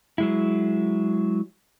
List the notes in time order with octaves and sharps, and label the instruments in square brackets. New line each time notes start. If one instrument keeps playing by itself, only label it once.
[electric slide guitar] F#3 G#3 E4